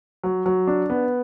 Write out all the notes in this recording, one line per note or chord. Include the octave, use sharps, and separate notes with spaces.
F#3
F#3
D4
B3